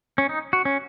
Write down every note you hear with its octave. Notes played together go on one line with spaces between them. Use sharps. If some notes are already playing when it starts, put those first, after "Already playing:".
C#4
D#4
F#4
C#4